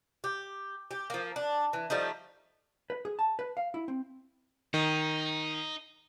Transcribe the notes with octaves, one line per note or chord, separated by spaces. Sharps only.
G4
G4
F3 A#3
D4
E3
F3 G3 A3 D#4
B4
G#4
A5
B4
F5
E4
C4
D#3 D#4